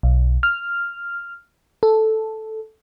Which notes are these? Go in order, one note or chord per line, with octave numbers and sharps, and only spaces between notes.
B1
F6
A4